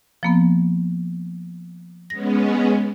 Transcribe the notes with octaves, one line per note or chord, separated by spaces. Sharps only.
F3 A#3 B3
G#3 B3 C#4 A#6